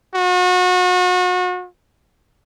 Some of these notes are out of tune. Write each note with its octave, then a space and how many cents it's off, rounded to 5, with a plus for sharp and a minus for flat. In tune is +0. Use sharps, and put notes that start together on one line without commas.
F#4 -35